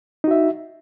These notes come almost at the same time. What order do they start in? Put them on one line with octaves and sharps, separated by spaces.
D#4 F#4 E5